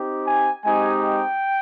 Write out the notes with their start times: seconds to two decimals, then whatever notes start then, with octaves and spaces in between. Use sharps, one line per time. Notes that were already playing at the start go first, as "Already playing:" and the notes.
Already playing: C4 D#4 G4
0.27 G#5
0.64 G#3 C4 D#4 G4 G#5
1.01 G5